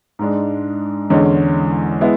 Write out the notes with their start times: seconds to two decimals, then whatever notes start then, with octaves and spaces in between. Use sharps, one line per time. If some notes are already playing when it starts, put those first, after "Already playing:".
0.19 G#2 G#3 D4
1.10 E2 D3 G#3 C#4
2.01 G#3 B3 E4